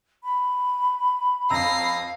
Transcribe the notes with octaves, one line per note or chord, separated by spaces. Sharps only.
B5
F2 F5 A#5 E6 A#6 C7